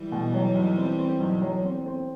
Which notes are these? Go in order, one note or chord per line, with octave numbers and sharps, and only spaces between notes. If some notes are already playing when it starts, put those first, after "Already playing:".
Already playing: E3 G3
B2
F#3
B1
C4
C4
B1
F#3
C4
C4